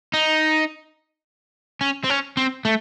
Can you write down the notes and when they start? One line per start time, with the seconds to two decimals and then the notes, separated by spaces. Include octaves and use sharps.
0.13 D#4
1.81 C#4
2.04 C4
2.10 C#4
2.37 C4
2.65 A3